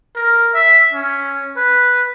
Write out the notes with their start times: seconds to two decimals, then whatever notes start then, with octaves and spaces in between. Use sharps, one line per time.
0.16 A#4
0.54 E5
0.93 C#4
1.57 B4